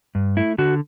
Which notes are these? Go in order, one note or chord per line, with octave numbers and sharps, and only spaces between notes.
G2
A3 E4
D3 F#4